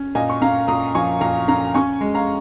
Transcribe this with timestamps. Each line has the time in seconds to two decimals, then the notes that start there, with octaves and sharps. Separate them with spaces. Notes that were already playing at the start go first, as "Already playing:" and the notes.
Already playing: C#4
0.15 A#2 D#5 G#5
0.30 C#6
0.42 C#4 F5 A#5
0.68 A#2 A#5 D#6
0.95 F3 G#5 C#6
1.21 A#2 F5 A#5
1.48 C#4 F5 A#5
1.75 C#4 G#5 C#6
2.01 G#3
2.15 F5 A#5